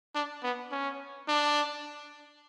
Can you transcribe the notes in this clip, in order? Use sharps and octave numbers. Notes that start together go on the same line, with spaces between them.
D4
B3
C#4
D4